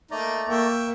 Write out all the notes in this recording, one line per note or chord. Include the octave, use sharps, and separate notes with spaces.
A3 A#3 D#4 D5 A#5
A#3 E5 G5 C#6